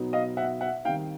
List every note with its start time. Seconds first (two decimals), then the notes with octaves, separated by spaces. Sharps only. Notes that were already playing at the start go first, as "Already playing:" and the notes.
Already playing: B2 F#3 B3 D#4
0.13 D#5 F5
0.37 E5 F#5
0.61 E5 F#5
0.85 D#3 G3 C4 D#4 F5 G5